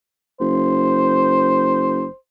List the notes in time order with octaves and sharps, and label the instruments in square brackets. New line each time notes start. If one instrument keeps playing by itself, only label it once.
[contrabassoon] F#1 [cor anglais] C5